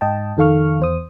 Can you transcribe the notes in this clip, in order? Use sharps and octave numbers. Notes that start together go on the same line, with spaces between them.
G#2 D#5 G5 A5
F2 D#3 A4 F5 C#6 F6
E2 C5 D#6